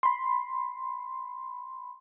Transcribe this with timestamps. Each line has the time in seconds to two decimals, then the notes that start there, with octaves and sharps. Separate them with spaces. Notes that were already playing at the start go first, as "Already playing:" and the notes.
0.03 B5 C6